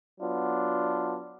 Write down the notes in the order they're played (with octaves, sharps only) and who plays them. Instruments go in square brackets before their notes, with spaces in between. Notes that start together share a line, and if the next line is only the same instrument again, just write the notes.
[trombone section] F#3 B3 D4 F4